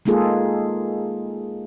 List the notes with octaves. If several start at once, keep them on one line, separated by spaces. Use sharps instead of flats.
G#3 A#3 D#4 F4 G#4 A4